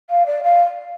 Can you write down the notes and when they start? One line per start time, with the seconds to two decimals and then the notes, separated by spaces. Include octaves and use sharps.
0.10 F5
0.26 D5
0.43 F5